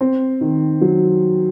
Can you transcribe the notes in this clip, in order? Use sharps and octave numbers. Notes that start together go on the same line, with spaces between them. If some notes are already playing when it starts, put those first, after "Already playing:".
C4
D#3
F#3